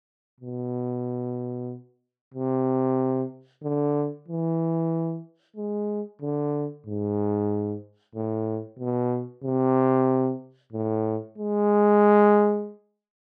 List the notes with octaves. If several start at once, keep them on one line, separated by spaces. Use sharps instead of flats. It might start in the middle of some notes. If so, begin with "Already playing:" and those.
B2
C3
D3
E3
G#3
D3
G#2
A2
B2
C3
A2
G#3